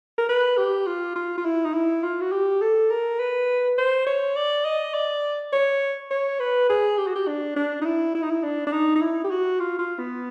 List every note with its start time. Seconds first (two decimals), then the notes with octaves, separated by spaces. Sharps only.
0.18 A#4
0.29 B4
0.58 G4
0.87 F4
1.16 F4
1.38 F4
1.45 E4
1.65 D#4
1.74 E4
2.03 F4
2.21 F#4
2.32 G4
2.61 A4
2.91 A#4
3.20 B4
3.78 C5
4.07 C#5
4.36 D5
4.65 D#5
4.94 D5
5.53 C#5
6.11 C#5
6.40 B4
6.69 G#4
6.98 G4
7.07 F#4
7.16 G4
7.27 D4
7.56 D4
7.81 D#4
7.85 E4
8.15 E4
8.23 D#4
8.30 E4
8.43 D4
8.67 D4
8.73 D#4
8.95 D#4
9.01 E4
9.24 G4
9.31 F#4
9.60 F4
9.79 F4
9.99 B3